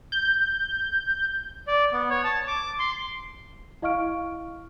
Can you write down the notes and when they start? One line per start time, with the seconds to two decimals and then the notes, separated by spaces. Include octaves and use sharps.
0.12 G6
1.67 D5
1.93 B3
2.10 C#5
2.24 A5
2.47 D6
2.79 C6
3.82 E4 D#5 F5 C#6 F6 D7